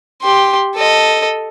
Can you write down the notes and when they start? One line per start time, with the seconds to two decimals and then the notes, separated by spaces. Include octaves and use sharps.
0.22 G4 C6
0.75 A4 D#5